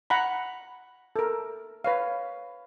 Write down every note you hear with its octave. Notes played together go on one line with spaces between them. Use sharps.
F#5 A#5 B5
A4 A#4
B4 C#5 F5